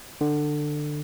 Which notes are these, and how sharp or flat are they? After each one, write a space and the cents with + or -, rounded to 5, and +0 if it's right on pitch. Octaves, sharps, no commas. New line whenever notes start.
D3 +20